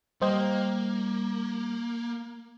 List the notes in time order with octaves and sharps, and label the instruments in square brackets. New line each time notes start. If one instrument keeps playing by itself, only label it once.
[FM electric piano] G3 [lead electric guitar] A#3 [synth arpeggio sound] C5 D#5 G5